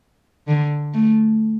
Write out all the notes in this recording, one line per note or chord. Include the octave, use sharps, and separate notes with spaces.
D3
A3